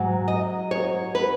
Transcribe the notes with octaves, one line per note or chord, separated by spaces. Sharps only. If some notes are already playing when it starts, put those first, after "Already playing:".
Already playing: G#2 F#3
D#5
C#5
B4